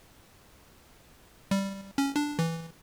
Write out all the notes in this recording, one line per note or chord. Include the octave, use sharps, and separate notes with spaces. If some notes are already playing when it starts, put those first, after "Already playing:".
G3
C#4
D4
E3